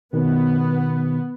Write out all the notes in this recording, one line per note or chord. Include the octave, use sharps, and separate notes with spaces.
B2 D#3 B3